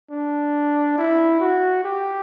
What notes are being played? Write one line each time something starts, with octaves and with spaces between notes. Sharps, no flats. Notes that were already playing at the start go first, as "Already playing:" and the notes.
D4
E4
F#4
G4